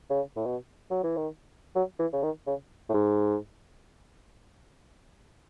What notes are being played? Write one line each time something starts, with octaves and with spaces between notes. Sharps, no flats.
C#3
A2
B2
F#3
E3
D#3
F#3
E3
C#3
D#3
C#3
A2
G#2